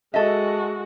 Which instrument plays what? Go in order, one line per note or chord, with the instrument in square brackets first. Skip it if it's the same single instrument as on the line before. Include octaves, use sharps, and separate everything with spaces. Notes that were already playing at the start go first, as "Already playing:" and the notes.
[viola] G#3 F#4 [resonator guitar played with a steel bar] A4 D#5 E5